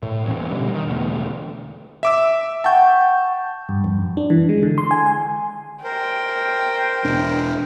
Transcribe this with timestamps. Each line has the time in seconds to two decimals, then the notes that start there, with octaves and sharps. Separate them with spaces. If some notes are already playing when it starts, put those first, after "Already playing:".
0.03 A2
0.25 A#1 E2 A#2 C#4
0.49 B2 D3 G3
0.73 D#3
0.86 E2 B2 D3 A3
2.03 E5 D6 E6
2.64 F#5 G5 A5 C#6 G6
3.69 G2
3.84 F2
3.97 F#2
4.17 D4
4.30 E3
4.49 G#3
4.63 D3
4.78 C6
4.91 G#5
5.06 G#5
5.84 A#4 C5 G5
7.05 E1 D4